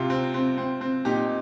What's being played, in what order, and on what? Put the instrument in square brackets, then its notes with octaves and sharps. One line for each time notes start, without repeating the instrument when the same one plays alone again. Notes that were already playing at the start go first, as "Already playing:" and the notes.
Already playing: [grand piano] C3 F4
C4
C4
C4
C4
A#2 D#4 G4